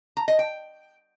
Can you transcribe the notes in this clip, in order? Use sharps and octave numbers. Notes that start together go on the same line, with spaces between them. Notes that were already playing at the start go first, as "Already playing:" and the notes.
A#5
D#5
G5